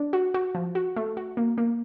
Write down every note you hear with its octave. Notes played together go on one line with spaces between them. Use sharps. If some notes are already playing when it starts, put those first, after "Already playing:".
Already playing: D4
F#4
F#4
F3
F#4
A3
F#4
A#3
A#3